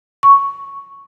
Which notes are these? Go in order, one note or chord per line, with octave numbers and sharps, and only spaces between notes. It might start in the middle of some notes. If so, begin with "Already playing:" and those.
C#6